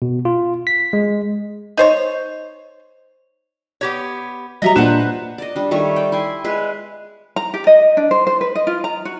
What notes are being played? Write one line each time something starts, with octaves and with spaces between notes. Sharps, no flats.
B2
F4
B6
G#3
D#4 C5 C#5
B3 G4 C#5
F#3 G3 D#5 E5 A#5
A#2 D4 B4 C5 F#5 E7
D5 D#5
G3 D4
D#3 G3 A3 C#5
D5 G5
E4 G5 G#5 C6
G#3 B4
A#5
G4
D#5
D4
C5
C5
B4
D#5
F4
A#5
F#4